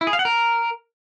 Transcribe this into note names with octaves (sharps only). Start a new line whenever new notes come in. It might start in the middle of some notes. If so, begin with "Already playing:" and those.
E4
G#4
F5
F#5
A#4